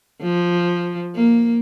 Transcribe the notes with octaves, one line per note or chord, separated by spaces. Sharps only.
F3
A#3